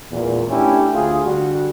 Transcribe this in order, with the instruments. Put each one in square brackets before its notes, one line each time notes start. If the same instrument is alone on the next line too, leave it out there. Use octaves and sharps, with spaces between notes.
[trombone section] G#1 E2 A#2
A3 C#4 D4 E4 G4
D2 F4 G#4
D3 G3 F#4